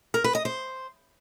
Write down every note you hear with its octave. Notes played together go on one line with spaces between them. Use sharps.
A#4
B4
D#5
C5